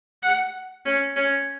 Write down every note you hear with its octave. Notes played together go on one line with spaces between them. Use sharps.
F#5
C#4
C#4